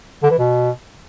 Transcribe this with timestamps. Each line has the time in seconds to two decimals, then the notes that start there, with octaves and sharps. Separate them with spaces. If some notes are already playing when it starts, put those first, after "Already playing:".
0.23 D3
0.31 E3
0.39 B2